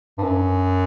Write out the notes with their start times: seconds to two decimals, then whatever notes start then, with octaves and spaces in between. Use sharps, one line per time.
0.18 G2
0.23 F#2